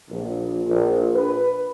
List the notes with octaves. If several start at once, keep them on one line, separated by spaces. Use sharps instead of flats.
A#1
A#1
B4